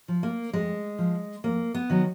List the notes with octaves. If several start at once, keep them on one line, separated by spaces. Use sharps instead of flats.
F3
A#3
F2 G#3
F3
F2 A#3
B3
D#3 F#3